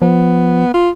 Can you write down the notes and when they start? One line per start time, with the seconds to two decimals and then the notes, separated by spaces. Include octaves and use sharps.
0.02 F3 B3
0.74 F4